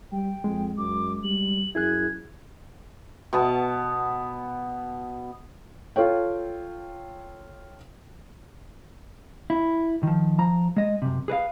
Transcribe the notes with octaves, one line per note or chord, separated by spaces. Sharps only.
G3 G5
F2 G#3
F#2 D6
G3 F#7
F#2 E4 G#4 F#6 G#6
B2 B3 A5
F4 A4 C#5 G5
E4
D#3 F3
F3 A#5
G#3 D#5
F#2 C3
G#4 B4 D5 F5